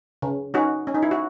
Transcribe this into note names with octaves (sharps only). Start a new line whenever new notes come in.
C#3
C#4 D#4 F#4
C#4
D#4
E4
F#4